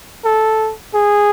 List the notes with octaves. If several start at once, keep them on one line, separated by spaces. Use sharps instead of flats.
A4
G#4